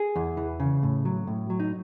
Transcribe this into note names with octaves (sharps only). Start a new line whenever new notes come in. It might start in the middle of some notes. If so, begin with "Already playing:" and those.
Already playing: G#4
E2
E3
C#3
A2
F#3
A2
F#3
D#4